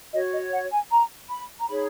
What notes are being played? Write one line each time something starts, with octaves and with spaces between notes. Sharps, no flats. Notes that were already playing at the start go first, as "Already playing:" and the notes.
F#4 C#5 D#5
D#5
F#5
G#5
A#5
B5
A#5
D#4 G#4 C#5 B5